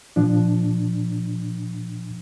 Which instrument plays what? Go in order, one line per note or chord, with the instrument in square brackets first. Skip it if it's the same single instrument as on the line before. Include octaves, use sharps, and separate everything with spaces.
[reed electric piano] A#2 F3 D4